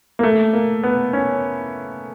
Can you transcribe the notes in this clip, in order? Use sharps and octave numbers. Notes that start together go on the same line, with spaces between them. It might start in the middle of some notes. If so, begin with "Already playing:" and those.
A#3
A3
A#3
B3
C#4